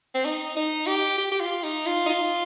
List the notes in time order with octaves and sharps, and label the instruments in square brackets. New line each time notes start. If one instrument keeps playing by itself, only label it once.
[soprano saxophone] C4
D#4
D#4
G4
G4
G4
F4
D#4
F4
D#4
F4